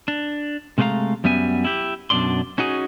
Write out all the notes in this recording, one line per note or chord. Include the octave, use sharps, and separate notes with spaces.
D4
C3 G#3 A3 B4 F5 A#5
F#2 G3 B3 E5 G#5
E4 G4
F#2 B2 D4 D5 C6
C#4 D#4 F#4 G#4